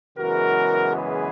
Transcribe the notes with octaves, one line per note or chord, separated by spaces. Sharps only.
F#2 C#3 E3 G#3 B3 F#4 A#4
G#4 B4